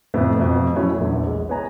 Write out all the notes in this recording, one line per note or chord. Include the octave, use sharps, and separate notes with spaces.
F2 A2 F3 A3 B3
F2 B2
F#3 A3 C#4 E4 F#4
A#1 E2
G#3
B3 C#5 G#5 A#5